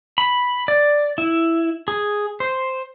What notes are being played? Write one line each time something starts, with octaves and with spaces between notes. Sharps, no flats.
B5
D5
E4
G#4
C5